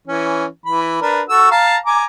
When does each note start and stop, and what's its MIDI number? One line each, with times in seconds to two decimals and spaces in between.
0.07 0.46 52
0.07 0.46 61
0.66 0.97 52
0.66 0.97 83
1.01 1.22 62
1.01 1.22 70
1.01 1.22 71
1.29 1.49 66
1.29 1.49 69
1.29 1.49 88
1.51 1.77 77
1.51 1.77 81
1.51 1.77 82
1.86 2.05 80
1.86 2.05 82
1.86 2.05 86